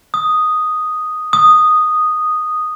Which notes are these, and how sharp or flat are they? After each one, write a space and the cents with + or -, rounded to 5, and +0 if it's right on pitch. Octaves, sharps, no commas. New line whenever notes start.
D#6 +0
D#6 -5